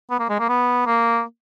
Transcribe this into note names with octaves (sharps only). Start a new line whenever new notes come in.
B3
A#3
G#3
A#3
B3
A#3